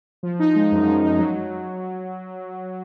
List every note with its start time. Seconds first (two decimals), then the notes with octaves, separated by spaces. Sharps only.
0.23 F3
0.40 D#4
0.56 G#3
0.72 F#2
0.87 F3
1.03 D#4
1.19 F#3